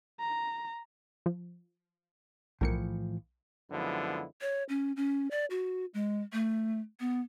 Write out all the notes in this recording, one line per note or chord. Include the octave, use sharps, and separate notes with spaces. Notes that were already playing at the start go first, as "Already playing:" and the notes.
A#5
F3
B1 A2 E3 F3 A#4 C#7
F#2 D3 F3 G#3 B3 E4
C#5
C#4
C#4
D5
F#4
G#3
A3
B3